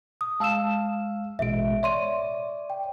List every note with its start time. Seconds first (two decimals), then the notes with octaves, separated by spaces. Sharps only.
0.21 D#6
0.40 G#3 F5 A5 E6 E7
1.39 A1 B2 G#3 E5 D7
1.83 C#5 D5 E5 C6 D#7
2.70 G5